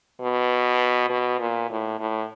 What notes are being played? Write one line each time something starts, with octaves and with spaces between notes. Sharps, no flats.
B2
B2
A#2
A2
A2